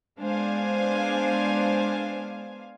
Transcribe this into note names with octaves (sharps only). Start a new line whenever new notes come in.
G#3 B3 D4 C5 F5 G#5